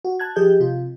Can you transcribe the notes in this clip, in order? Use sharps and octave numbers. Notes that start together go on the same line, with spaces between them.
F#4
A5 F#6 G#6
F3 G4 G#4 D#5 G6
C3 F4